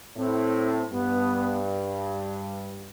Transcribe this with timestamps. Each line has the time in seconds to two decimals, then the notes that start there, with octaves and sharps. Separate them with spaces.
0.17 A2 C4
0.91 G2 B3